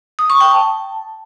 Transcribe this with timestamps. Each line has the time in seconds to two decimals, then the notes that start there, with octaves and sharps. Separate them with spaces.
0.19 D#6
0.30 C#6
0.41 G5
0.52 A5